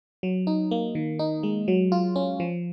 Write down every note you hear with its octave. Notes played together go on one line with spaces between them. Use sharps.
F#3
D#4
A#3
D#3
D#4
G#3
F#3
F4
C#4
F3